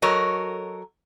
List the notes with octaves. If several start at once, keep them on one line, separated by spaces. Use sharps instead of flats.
F#3 F#4 A4 A#4 C#5 D#5